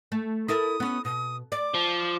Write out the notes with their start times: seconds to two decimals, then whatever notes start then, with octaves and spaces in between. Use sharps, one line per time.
0.12 A3
0.48 E4 A4 A#4 D#6
0.80 B3 C#4
1.05 B2 D#6
1.52 D5 D6
1.74 F3